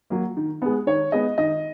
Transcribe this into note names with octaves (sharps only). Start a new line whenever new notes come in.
F#3 A#3
D#3
G#3 B3
D#3 C#5
G#3 B3 D#5
D#3 D#5